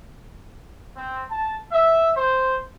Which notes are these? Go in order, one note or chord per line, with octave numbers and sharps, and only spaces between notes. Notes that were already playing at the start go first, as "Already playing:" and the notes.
C4
A5
E5
C5